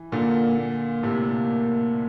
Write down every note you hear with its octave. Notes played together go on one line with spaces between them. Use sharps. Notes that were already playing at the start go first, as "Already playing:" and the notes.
Already playing: E3
A#2 D3 A#3
A#3
A2 C3